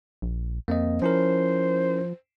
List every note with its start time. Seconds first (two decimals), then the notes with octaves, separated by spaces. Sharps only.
0.22 A#1
0.68 F2 A#3 C4 D#5
1.02 F3 C#4 E4 A#4 C5